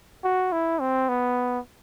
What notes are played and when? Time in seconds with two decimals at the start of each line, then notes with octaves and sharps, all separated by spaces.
0.24 F#4
0.52 E4
0.80 C4
1.09 B3